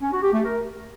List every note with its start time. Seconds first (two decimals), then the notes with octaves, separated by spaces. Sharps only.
0.01 C#4
0.12 F#4
0.22 G4
0.33 A3
0.44 A#4